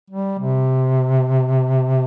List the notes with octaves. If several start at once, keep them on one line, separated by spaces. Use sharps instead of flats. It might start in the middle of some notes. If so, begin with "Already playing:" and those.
G3
C3